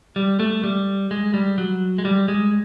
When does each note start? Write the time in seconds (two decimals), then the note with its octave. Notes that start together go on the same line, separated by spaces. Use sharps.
0.16 G3
0.40 A3
0.64 G3
1.11 G#3
1.34 G3
1.58 F#3
1.98 G#3
2.05 G3
2.28 G#3